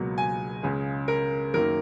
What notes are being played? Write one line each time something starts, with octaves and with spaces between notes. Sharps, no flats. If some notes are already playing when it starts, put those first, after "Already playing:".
Already playing: C#2 B2 F#3 A#3
G#5
C#2 C#3 G#3
A#4
F#2 D#3 F#3 A#3 A#4